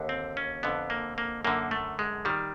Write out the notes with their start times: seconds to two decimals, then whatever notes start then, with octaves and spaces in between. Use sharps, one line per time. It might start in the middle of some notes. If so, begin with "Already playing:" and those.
Already playing: D#2 D3
0.09 C4
0.37 C#4
0.63 F2 D3 B3
0.90 A#3
1.18 A#3
1.44 F#2 D3 A#3
1.71 A3
1.99 G#3
2.25 D#3 G3